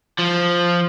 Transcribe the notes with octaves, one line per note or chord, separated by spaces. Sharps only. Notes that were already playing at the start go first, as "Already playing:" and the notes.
F3